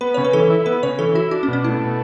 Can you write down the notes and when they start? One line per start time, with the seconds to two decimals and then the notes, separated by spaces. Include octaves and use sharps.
0.01 B3 B4
0.14 C#3 C#5
0.25 B4
0.33 E3 A4
0.50 E4
0.66 B3 B4
0.83 C#3 C#5
0.99 E3 A4
1.15 E4 F#4
1.31 D4 F#4
1.43 C#4
1.48 B2
1.53 C#4
1.64 A3 E4
1.81 B2